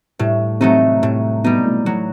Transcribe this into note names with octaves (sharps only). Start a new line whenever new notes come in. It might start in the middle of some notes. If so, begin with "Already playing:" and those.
A2 G3
C3 F#3 A3 D#4
A2 C3
B2 G3 D#4
A2
A2 F#3